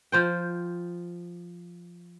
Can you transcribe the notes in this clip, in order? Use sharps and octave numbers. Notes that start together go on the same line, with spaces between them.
F3 C5 G5